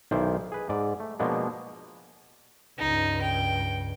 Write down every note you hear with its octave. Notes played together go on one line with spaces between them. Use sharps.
B1 D#3 E4 C5 D5
G#4 B4
G#2 D5
A3
B2 F3 G#3 A#3 B3 D4
C#2 G2 D#4
G5